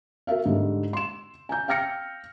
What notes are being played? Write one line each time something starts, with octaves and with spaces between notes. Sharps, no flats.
F#4 A#4 E5 F5
G#2 D3 G3
C6 E7
G#5 A#5 G6
F5 G5 F6 A#6 C#7